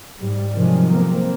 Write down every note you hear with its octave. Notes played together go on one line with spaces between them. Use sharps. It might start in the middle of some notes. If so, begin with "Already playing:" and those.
G#2 G3
C3 D#3 F3 F#3 G#3
A#3 C4